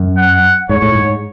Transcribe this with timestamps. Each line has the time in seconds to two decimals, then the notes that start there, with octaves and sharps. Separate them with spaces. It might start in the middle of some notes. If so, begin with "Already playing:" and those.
Already playing: F#2
0.17 F#5
0.69 G#2 C#5
0.82 A2
0.95 G#2